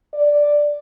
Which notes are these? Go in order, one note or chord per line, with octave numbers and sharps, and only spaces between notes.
D5